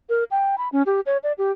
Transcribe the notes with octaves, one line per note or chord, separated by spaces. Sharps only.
A#4
G5
B5
C#4
G4
C#5
D5
G4